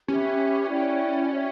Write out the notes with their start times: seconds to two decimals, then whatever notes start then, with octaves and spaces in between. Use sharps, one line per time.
0.08 C#4 G4 B4 E5
0.68 E4 B4 D5 G5
1.30 F#4 C#5 E5 G5